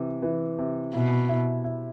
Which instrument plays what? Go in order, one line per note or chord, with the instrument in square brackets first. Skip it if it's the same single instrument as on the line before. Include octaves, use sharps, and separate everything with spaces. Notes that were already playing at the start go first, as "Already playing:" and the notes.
Already playing: [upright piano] C3 E3
E3
C3
[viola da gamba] B2 [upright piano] E4
[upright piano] E4
E4